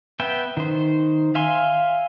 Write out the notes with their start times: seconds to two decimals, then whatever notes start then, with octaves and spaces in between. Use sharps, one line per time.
0.20 B3 B4 E5 G5
0.57 D#3 C5
1.35 E5 F5 G#5 C6